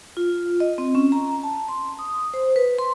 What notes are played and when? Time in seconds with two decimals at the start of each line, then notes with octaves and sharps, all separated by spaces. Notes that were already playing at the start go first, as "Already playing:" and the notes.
0.17 F4
0.60 D#5
0.78 C4
0.95 C#4
1.12 A#5
1.43 A5
1.68 C6
1.99 D#6
2.34 C5
2.56 B4
2.79 C6